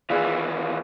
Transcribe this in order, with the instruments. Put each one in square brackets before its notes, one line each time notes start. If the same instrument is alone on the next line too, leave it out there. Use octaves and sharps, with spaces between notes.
[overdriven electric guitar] D#2 E3 [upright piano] F4 G#4 D5